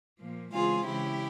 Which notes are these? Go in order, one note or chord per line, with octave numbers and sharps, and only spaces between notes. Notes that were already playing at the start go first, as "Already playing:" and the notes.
A#2 F3 A#3
C#3 E3 G#3 C4 F4 G#4
C#3 E3 G#3 E4 G4